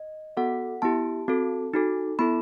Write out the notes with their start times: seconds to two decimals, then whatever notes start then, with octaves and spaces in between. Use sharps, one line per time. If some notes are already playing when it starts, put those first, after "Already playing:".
Already playing: D#5
0.37 B3 F#4 A4 F#5
0.82 B3 E4 G4 A5
1.28 C4 F#4 A4
1.74 D#4 F#4 A4
2.19 B3 E4 A4 B5